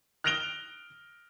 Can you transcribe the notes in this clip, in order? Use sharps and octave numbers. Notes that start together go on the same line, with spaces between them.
F6 F#6 A#6 D7 F7 G7